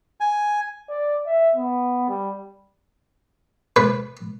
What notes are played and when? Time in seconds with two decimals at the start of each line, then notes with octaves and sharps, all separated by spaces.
0.20 G#5
0.89 D5
1.26 E5
1.55 B3
2.09 G3
3.76 B4